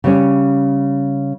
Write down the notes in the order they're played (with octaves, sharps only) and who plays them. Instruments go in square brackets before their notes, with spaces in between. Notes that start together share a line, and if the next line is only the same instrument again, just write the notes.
[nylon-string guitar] C#3 G3 C#4